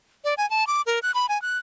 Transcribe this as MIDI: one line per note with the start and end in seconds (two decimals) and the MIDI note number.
0.24 0.34 74
0.38 0.48 80
0.50 0.67 81
0.67 0.82 86
0.86 0.99 70
1.03 1.12 90
1.14 1.26 83
1.29 1.40 80
1.42 1.58 90